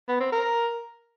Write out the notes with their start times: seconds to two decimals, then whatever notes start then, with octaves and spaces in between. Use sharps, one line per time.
0.08 B3
0.20 C4
0.32 A#4